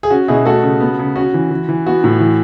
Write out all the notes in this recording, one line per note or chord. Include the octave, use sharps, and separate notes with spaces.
G#4
C#4 F#4
B2 E4 G#4
A3 F#4 A4
C#3
B3
C#3
C#4 F#4
E3
E3
E3
B3 F#4
A2
E3